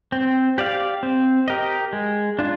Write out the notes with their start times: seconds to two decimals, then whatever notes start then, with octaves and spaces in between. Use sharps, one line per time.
0.12 C4
0.58 G4 D5 F5
1.03 C4
1.48 G4 A#4 D#5
1.93 G#3
2.39 D4 F4